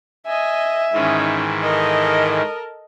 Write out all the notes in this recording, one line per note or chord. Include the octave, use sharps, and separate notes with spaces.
D#5 E5 G#5
G#2 D#3 E3 C#4 D#4
A4 A#4 D#5